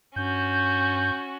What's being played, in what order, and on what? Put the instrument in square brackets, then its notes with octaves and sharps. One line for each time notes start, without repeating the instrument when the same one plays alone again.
[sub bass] G2 [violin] C#4 F#4 [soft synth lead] G6